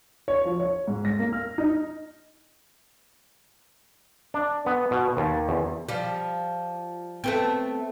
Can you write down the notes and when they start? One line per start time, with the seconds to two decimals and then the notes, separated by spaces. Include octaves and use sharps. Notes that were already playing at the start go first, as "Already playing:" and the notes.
0.28 C#5
0.45 F3
0.60 C#5
0.88 G#2
1.05 A#6
1.19 A#3
1.33 F6
1.58 D#4
4.34 D4
4.66 B3
4.91 B2
5.17 D#2
5.49 E2
5.89 F3 G3
7.24 A3 B3 C4